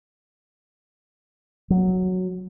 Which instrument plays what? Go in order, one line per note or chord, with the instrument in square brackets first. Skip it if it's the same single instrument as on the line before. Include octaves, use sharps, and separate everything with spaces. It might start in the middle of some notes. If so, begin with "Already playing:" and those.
[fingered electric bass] F#3